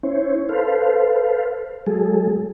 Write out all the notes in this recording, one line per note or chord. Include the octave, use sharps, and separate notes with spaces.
C#4 E4 C5 C#5
A4 B4 C5 F5
F#3 G#3 G#4 A4